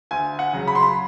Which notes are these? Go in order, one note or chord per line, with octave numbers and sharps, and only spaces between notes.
D2 G#5
F#5
C#3 F#3
B5
C6
B5